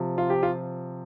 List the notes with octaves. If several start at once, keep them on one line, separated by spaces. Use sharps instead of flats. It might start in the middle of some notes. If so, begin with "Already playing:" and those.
Already playing: C3 F3
F4
G4
F4